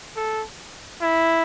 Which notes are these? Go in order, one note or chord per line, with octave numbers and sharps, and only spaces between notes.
A4
E4